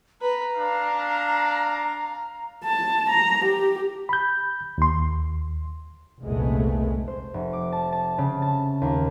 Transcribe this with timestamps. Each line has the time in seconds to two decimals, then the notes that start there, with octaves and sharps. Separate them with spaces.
0.21 B4 A#5
0.58 D4 F5
2.64 A5
3.10 A#5
3.45 G4
4.09 B5 G6
4.78 D#2 C6
6.23 F1 C2 A#2 G#3 A3 B3
7.08 C5
7.34 F1
7.53 D6
7.72 A5
7.92 A5
8.18 C#3
8.42 A5
8.82 D#2